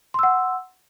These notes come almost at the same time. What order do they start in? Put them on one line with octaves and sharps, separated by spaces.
C6 E6 F#5